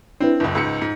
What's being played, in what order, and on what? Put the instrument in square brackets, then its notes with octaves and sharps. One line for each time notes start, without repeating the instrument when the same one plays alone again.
[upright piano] C4 [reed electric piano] D4 E4 B4
[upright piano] F#1 C#2
[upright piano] C#2 G#2 C#7 [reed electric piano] E6
[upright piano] G#2